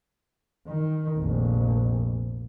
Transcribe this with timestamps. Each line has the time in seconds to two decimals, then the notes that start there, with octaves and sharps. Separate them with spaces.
0.67 D#3
1.18 F1 A#1